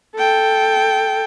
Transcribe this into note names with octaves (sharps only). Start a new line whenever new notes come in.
A4 G5